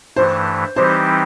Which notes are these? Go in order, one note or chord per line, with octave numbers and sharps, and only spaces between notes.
G2 E3 A3 C5
E3 G3 C4 D#4 G4 C5